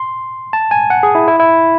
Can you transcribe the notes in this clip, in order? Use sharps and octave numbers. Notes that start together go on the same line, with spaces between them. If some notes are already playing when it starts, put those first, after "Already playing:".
Already playing: C6
A5
G#5
F#5
G#4
E4
E4
E4